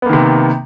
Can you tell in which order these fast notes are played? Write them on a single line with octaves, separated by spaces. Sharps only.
B3 A#3 D#3 C3